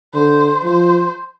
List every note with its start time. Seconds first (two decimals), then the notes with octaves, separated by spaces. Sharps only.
0.14 D3 C5
0.64 F3 C5